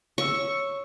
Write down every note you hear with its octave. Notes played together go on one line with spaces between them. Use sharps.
C#5 C#6 E6